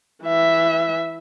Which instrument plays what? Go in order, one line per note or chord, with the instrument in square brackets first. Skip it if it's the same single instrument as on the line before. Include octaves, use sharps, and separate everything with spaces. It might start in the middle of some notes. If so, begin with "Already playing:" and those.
[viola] E3 E5